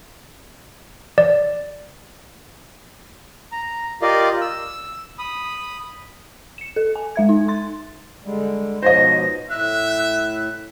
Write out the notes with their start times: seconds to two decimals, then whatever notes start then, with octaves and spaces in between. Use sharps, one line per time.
1.18 D5
3.52 A#5
4.02 F4 G4 A#4 D5 D#5 F5
4.41 E6
5.19 B5 D#6
6.58 C#7 E7
6.76 A4
6.96 G#5
7.16 G#3 E5 G#6
7.29 D#4
7.48 C6 A6
8.24 D3 G3 G#3
8.83 G#2 B2 F3 C5 C#5 D#5 A#6
9.50 A2 E5 F#6
9.86 F#6